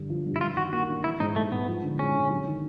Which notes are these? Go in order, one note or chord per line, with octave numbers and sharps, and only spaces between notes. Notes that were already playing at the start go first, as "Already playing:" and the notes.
Already playing: G2 D3
F3
G2
E4
G3 F4
D#3 F#4
A#3 F#4
D4
E3 E4
G#2 D#4
G3 A3
G#2 B3
F3
D3
G#3 C#4
D3
F#3
D#3